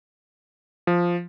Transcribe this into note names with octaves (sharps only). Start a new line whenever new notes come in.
F3